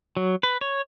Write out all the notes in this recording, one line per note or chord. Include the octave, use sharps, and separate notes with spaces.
F#3
B4
C#5